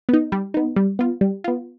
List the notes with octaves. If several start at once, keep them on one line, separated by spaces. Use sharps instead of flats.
B3 D#4
G3
B3 D#4
G3
B3 F4
G3
B3 F4